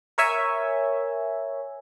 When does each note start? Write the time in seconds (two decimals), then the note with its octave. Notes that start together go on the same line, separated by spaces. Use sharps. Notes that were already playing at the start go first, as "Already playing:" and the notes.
0.18 A#4 C#5 E5 G#5